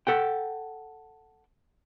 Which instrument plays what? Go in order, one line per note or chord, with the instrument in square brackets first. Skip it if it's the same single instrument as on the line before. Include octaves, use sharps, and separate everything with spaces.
[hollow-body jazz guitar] A4 F#5 G5